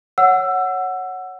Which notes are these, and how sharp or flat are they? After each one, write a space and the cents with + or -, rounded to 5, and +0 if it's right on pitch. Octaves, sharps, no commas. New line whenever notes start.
C#5 -5 F#5 +0 E6 +20